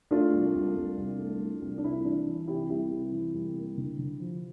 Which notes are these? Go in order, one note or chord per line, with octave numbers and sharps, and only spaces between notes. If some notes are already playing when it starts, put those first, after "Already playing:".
A3 D4 F4
C2
C2
C2
C2
A3
A3
C2
D4
C3 E4
E3 D4
E3 E4
C3 E4 G4
C2 E4 G4
C3
E3
C2
A#3
D3
D3
F3